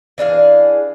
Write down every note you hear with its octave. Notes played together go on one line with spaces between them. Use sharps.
E3 D4 G#4 F5